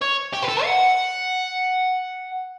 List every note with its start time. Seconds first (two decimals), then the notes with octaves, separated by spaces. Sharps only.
0.01 C#5
0.33 G4
0.42 B4
0.48 A4
0.64 F#5